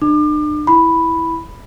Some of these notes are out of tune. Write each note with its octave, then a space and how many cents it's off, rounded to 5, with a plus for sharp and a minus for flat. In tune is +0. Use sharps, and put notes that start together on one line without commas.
D4 +40 D6 +35
E4 +0 B5 +0